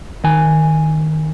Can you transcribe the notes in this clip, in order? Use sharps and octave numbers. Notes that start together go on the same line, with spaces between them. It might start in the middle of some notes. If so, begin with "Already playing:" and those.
D#3 G#5